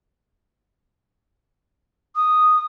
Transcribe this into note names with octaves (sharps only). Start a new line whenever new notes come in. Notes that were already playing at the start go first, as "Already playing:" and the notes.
D#6